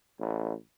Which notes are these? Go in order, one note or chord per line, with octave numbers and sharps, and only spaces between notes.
A1